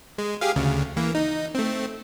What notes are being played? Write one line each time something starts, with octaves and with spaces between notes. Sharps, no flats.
G#3
G4 G#4 F5
D2 C#3
E3 A#3
D#4
A3 C4